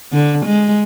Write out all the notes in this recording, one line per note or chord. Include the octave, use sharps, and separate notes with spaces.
D3
G#3